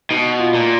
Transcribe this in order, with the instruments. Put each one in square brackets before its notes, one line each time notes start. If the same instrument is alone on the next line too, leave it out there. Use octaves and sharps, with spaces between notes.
[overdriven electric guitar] B2 [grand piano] D#4
[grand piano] F4
[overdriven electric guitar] A#2